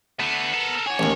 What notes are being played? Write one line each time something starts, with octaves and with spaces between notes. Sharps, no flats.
D3 A3 B3
A4 A#4
F#4 G#4 C#5
A1 D#2